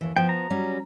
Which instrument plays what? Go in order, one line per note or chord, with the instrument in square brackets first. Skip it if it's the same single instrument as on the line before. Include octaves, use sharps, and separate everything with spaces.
[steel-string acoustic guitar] D#2 E3
[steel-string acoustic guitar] F3 B3 [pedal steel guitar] G5
[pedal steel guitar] A#5
[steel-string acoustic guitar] F#3 G3 C#4